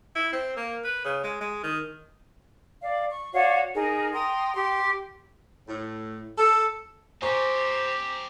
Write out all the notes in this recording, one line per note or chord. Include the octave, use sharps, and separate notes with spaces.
E4
C4
A#3
B4
C#3
G#3
G#3
D#3
D5 F5
C#6
F#4 C#5 D5 F5
D#4 G#4 A#4
G5 A#5 C6 D#6
G4 C6
A2
A4
C4 G4 C5 D#5 G#5 A#5 C#6